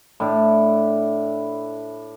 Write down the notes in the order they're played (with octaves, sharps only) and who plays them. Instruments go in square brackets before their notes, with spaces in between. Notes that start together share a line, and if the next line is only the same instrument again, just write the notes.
[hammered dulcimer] A2 D4 E4